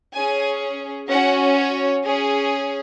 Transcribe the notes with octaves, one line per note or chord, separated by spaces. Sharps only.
C#4 G#4 G#5
C#4 F#4 F#5
C#5
C#4 G#4